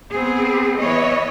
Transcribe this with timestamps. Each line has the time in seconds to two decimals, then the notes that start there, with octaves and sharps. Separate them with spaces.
0.12 B3 C4 G#4
0.77 E3 B3 C#5 D#5